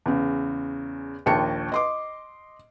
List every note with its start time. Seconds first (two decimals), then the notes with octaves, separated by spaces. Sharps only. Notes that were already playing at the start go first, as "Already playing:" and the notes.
0.06 E2 C#3
1.26 A#1 D#2 A5 C#7
1.72 D#5 C6 D6